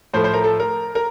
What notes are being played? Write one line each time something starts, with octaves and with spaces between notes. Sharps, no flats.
A2 F3 A3 C5
C5
A#4
A4
A#4
A#4